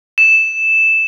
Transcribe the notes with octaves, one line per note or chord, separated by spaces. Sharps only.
E7